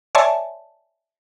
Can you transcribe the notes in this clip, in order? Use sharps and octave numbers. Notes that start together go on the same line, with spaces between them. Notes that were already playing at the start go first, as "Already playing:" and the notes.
C#5 D5 E5 G#5 A5 C6